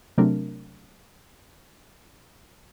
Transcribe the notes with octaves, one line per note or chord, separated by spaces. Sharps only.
C3 F#3 A3 C4 D4 A#4